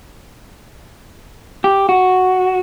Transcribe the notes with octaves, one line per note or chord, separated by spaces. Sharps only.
G4
F#4